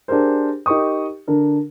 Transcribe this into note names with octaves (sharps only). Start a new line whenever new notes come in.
D4 G4 G#4 A#4 C5
D#4 G4 A#4 C#6 D#6
D3 D4 A#4